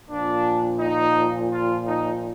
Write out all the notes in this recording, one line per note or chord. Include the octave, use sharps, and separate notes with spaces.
A#2 F3 D4
D#4
F4
D#4